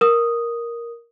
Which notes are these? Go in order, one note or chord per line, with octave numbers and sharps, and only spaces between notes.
A#4 D#6